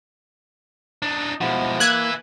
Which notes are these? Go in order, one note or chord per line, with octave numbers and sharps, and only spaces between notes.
D4 D#4
B2 F3 G#3 E4 F#4
A#3 B4 E5 F#6 G#6